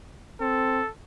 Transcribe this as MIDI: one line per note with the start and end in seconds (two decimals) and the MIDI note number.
0.41 0.82 60
0.41 0.89 69